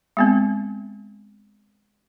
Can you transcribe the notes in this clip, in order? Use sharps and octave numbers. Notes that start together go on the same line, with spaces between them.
G#3 B3 C4